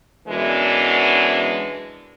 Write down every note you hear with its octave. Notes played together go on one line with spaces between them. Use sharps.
F#2 B2 E3 G#3 D4